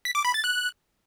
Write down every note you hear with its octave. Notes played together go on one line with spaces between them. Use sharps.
B6
D6
B5
A6
F#6